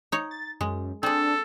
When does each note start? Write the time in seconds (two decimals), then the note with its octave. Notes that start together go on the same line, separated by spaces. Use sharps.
0.12 D#4 C#5
0.31 A6
0.61 F#2 G#3
1.03 C4 D4 G#4 A4